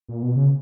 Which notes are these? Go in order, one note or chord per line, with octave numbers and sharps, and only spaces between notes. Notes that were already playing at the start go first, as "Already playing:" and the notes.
A#2
B2
C#3